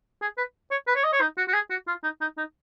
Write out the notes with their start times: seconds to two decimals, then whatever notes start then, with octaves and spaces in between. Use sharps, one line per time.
0.22 G#4
0.38 B4
0.71 C#5
0.87 B4
0.96 C#5
1.04 D#5
1.13 C#5
1.21 D#4
1.38 F#4
1.48 F#4
1.54 G#4
1.70 F#4
1.88 F4
2.03 D#4
2.21 D#4
2.38 D#4